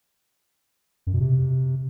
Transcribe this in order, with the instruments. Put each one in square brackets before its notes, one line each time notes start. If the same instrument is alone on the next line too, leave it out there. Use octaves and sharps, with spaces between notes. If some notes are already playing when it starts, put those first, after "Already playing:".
[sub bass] F#2
B2
C3